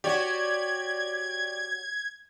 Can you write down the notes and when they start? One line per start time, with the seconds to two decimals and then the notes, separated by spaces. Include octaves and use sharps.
0.04 F#4 G4 C#5 D5 G#6